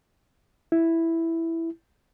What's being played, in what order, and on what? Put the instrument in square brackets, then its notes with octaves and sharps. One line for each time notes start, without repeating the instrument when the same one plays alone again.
[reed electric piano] E4